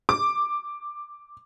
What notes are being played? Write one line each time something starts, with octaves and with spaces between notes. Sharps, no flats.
D6